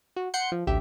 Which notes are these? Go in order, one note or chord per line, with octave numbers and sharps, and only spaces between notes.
F#4
F#5 C6 G6 C#7
F3
A1 D2 G4 E5